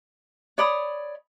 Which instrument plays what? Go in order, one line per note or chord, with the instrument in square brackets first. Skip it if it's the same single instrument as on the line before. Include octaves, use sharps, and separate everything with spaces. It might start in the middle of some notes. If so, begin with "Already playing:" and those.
[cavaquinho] C#5 D5 B5 D#6